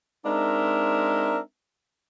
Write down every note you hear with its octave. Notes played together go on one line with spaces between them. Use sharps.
G#3 C4 D4 D#4 A#4 E5